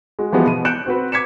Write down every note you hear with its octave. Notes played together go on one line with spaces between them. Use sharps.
G#3 F#4
E3 F3 G3 G#3 B3 F#4
B2 D#7
F#6 G6 C#7 D7 E7
C4 F#4 B4
D6 G#6 B6 C#7 E7